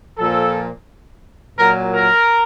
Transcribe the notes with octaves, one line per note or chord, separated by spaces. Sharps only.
A#2 F3 A4
A#2 F#3 A#4
A#4